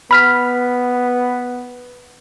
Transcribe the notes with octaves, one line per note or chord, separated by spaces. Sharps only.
B3 B5 F6 B6